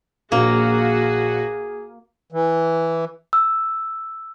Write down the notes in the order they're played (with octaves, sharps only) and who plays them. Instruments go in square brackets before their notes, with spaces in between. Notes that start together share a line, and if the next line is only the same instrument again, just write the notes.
[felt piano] A#1 [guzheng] A#3 [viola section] F#4 [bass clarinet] G#4
[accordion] E3
[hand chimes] E6